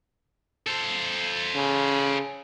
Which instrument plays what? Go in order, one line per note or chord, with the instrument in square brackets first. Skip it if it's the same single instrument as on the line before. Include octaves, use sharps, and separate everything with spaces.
[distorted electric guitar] A4 C5
[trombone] C#3